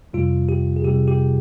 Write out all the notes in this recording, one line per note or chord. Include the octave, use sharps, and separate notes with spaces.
F2 C3 G3 F4
G4
G#4
F2 C3 G3 G4
G4